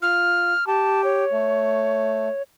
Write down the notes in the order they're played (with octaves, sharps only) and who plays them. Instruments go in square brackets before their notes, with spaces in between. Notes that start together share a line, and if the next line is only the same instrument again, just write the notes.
[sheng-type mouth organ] F4 [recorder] F6
[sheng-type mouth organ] G4 [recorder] A5
[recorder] C#5
[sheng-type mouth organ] A3